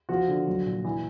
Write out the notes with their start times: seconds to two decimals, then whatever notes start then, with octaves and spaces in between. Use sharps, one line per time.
0.09 F3 F#4
0.28 D3
0.47 F#3
0.66 A#2
0.84 E3